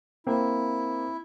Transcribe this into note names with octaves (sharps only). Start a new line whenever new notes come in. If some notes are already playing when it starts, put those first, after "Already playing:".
A#3 C4 E4